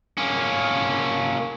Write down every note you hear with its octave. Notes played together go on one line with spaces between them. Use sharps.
A#3 C#4